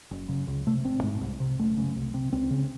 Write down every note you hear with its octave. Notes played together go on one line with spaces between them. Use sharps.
F#1
F#2 C#3
C#2
C3 A3
G#1 C4
G#2
C2
C3
F#1 A3
F#2 C#3
C2
C3
C#2 C4
C#3